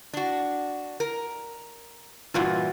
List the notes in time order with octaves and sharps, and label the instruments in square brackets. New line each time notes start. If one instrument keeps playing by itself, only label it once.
[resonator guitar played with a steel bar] D4 F#4
A#4
[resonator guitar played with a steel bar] G2 A#2 E3 [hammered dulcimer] F4 F#4